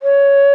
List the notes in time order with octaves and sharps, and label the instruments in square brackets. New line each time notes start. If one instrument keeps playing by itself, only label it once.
[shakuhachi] C#5